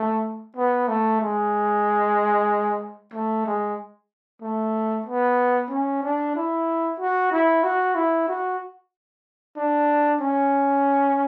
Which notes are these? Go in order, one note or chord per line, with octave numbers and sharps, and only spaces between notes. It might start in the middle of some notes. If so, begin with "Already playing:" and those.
Already playing: A3
B3
A3
G#3
A3
G#3
A3
B3
C#4
D4
E4
F#4
E4
F#4
E4
F#4
D4
C#4